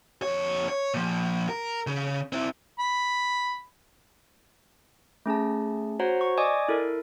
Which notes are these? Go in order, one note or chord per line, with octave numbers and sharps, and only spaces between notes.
F2 C#5
C#5
A#2 F3
A#4
C#3
C4 E4
B5
A3 C#4 G#4 A5
F#4 C5 C#5 F#5 A#5
C#6
D5 D#5 G#5 D6 D#6 G#6
E4 A4 A#4